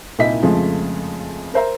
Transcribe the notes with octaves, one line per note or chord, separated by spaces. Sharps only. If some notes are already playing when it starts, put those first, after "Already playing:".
C2 A#2 D#4 E4 D#5 B6
F2 C#3 F3 G#3 A3
A#4 C5 E5 A#5